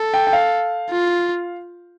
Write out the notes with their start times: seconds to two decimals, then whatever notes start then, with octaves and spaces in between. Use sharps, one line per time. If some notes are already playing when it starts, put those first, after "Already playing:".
Already playing: A4
0.14 G5
0.27 G5
0.33 F5
0.90 F4